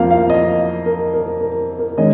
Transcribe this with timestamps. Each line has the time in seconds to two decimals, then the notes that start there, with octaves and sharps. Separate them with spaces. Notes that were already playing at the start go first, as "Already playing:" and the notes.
Already playing: F2 F3 A#3 F5
0.11 F5
0.30 D#5
0.86 A#4
1.14 A#4
1.41 A#4
1.79 A#4
1.97 D#3 G#3 C#4 D#5